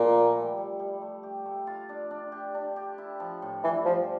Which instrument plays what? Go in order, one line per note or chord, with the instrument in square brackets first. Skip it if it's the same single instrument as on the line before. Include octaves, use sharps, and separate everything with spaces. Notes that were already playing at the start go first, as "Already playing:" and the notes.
Already playing: [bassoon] A#2 [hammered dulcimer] F3 A3
[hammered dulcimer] E4
G3
G3
G3
A3
G4
A3
F4
D4
D4
G4
D4
G4
E4
F3
A2
[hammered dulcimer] G2 [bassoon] E3
[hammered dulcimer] G2 [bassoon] F3